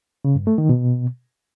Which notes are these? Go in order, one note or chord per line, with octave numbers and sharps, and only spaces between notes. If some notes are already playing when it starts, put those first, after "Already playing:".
C#3
G2
A3
D#3
B2